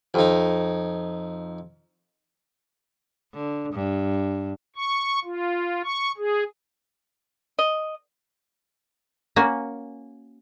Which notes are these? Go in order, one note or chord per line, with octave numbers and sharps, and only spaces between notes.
F2 D#4
D3
G2
C#6
F4
C#6
G#4
D#5
A#3 C#4 F#4 G#5